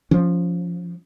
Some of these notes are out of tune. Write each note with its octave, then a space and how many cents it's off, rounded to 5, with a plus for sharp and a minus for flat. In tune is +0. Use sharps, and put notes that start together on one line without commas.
F3 +0 C#4 +25